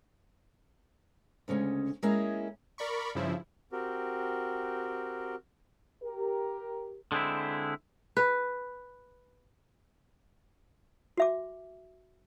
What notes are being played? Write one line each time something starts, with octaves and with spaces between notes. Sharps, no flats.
D2 C#3 G#3 C#4
G#3 A#3 C#4 E4 G#4 A#4
A#4 D5 B5 C#6
G2 C#3 F3 E4
C4 F#4 G4 A#4
G4 A#4
D3 G#3 C4 E4
B4
F#4 E5 D6